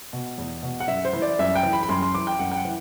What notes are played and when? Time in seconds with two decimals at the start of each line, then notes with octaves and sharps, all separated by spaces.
0.13 B2
0.38 E2
0.63 B2
0.80 F#5
0.88 F#2 E5
1.05 C5
1.13 E3
1.22 D5
1.39 F#2 E5
1.56 G5
1.63 E3
1.73 B5
1.83 B5
1.89 F#2 C6
2.02 C6
2.15 E3 D6
2.27 G5
2.39 F#2 F#5
2.52 G5
2.56 F#5
2.65 E3